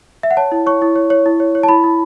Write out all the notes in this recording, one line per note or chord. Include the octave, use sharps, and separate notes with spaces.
E5
F#5
C#5 A5
E4
C#5 C#6
E4
C#5
C#5
E4
C#5
C#5
A5
E4 B5
E4